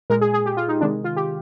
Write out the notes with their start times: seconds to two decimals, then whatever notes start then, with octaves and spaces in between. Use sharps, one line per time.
0.10 A#2 G#3 A#4
0.21 G#4
0.34 G#4
0.46 G4
0.57 F4
0.68 D#4
0.81 C3 D#3 G#3 D4
1.04 F4
1.16 G4